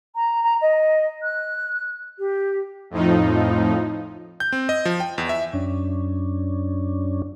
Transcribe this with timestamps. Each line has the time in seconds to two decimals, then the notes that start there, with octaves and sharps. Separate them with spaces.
0.15 A#5
0.43 A#5
0.61 D#5
1.23 F#6
2.19 G4
2.90 F2 A2 F3 D#4
4.40 G6
4.52 C4
4.69 D#5
4.85 F3
5.00 G5
5.18 E2
5.29 E5
5.53 F#2 C#4 D4